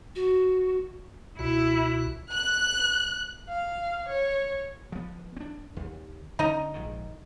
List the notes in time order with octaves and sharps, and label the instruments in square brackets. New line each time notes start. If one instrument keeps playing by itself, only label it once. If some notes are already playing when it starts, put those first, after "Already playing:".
[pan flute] F#4
[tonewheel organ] C#2 B2 F#4 [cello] E4
[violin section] F#6
[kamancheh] F5
C#5
[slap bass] F3 B3
C4 D4
D#2
[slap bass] D3 C#4 [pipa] D#4 D#5 A#5
[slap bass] A#1 G#2 D#3